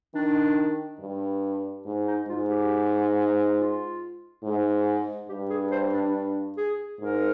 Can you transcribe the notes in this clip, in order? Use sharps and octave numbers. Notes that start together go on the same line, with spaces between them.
D#3 D4
G2
G#2
D#4
G#2 F4
G4
F4
G#2
G2 G4
G#4
C5
D4
D4
G#4
G#2 A#4